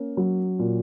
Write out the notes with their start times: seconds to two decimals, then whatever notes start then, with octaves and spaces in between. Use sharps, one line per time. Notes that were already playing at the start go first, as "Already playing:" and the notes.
Already playing: A#3 C#4
0.17 F#3
0.59 A#2